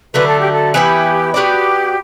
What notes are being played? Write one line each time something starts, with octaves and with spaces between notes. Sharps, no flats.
D3 F#3 A3 B4
A4
G4
A4
E3 B3 E4 G4 B4
B3 F#4 G4 B4 D5